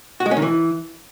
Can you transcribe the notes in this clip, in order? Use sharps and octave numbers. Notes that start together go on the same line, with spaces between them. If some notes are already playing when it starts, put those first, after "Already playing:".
F#4
G#3
C#4
D#3
E3